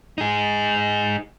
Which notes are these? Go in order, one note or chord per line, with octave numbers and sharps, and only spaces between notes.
D#4 G#4